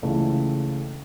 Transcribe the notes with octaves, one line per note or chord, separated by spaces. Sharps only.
C#2 C#3 E3 A3